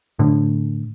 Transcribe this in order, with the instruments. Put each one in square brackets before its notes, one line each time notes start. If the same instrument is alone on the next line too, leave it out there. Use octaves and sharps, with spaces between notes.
[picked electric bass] A2 D3